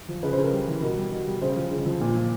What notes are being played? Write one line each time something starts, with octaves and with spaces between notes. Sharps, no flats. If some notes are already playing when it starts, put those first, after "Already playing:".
F3
C#3 B4
C5
C#3
A#4
G3
E3
B2 A#4
G3
B2
G3
C#3 C5
F3
C#3
F3
A#2
F3